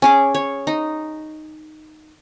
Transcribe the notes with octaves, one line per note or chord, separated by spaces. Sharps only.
C#4 G#4 D6
C#5
D#4